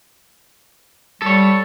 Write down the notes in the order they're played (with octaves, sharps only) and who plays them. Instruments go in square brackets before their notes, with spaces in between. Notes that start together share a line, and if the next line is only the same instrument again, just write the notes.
[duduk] G3 [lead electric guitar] A4 C#5